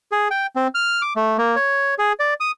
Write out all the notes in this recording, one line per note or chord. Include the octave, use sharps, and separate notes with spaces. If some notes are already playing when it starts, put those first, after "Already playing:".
G#4
G5
C4
F6
D6
A3
A#3
C#5
G#4
D5
D#6